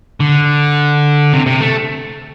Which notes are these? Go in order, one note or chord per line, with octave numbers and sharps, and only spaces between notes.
D3
C3
C3
A3